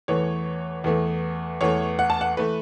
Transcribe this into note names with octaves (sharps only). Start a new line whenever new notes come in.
E2 E3 A3 C#5
E2 E3 A3
E2 E3 A3 C#5
F#5
A5
F#5
E3 A3 B4